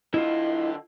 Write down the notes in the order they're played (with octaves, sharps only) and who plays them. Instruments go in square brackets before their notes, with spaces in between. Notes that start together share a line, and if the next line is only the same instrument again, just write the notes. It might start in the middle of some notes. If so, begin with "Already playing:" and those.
[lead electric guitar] D3 D#5 [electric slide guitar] E4 F4